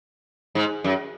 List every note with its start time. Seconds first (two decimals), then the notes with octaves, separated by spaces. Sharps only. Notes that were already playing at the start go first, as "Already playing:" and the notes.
0.55 G#2
0.84 F#2